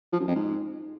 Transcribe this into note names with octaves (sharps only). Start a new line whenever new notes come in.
F3
F#2
F2
G#2